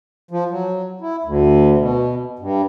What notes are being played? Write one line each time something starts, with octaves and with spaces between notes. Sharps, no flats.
F3
F#3
E4
D2
B2
G2